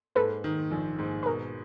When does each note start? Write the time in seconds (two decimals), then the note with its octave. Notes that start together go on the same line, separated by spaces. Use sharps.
0.15 G#2 A4 B4
0.44 D#3
0.71 A#1
0.99 G#2
1.23 B4
1.26 B2 A#4